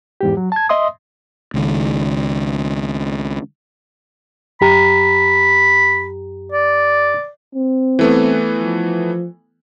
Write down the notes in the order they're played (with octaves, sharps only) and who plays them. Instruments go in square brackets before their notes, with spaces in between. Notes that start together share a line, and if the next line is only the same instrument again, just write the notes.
[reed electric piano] E2 G#2 G4
F#3
A5 G#6
D#5 E5 C6 D#6
[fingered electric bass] C#2 D#3
[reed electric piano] F#2 G4 A#5 [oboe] B5
[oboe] D5
[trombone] C4
[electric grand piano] E3 A3 B3
[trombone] F3